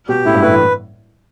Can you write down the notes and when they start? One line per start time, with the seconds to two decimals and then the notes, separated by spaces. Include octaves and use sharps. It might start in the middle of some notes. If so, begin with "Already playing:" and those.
0.09 B2 G4
0.25 A2 E4
0.34 G2
0.42 A2 B4
0.51 E3